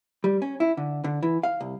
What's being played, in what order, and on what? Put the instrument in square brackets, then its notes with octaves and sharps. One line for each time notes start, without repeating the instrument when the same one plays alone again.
[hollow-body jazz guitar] G3
C#4
E4
D3
D3
E3
F5
C2